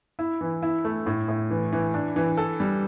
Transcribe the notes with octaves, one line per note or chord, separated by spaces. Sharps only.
E4
E3
E4
A3
A2
A2
E3
E3
D4
E3
A4
G3